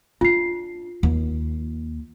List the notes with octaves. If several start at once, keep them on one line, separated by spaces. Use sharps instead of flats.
D4 F4 C7
D#2